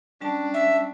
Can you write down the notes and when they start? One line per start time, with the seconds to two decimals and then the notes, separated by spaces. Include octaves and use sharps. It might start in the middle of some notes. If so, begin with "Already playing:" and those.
0.21 G3 C#4 D4 A5
0.54 E5